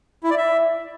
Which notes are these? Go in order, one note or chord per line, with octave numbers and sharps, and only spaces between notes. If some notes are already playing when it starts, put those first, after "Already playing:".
E4
D5
E5